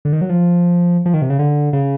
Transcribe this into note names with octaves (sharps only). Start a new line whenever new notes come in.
D3
D#3
F#3
F3
F3
D#3
C3
C#3
D3
C#3